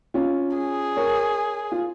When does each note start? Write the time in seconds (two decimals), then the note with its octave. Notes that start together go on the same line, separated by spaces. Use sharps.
0.14 C#4 F4
0.56 G#4
0.96 A#4 C#5
1.72 F4